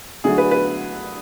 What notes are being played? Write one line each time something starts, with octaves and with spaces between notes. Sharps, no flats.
D3 F#3 A3 G#4
B4
B4